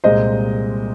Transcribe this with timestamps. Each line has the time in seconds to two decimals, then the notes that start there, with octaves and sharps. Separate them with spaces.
0.04 C2 A#2 G#3 C5 D#5